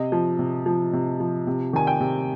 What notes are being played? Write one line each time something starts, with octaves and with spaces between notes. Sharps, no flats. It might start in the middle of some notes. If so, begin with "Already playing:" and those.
Already playing: C3 D#5
F3
C3
F3
C3
F3
C3
D#3 G#5
G5
C3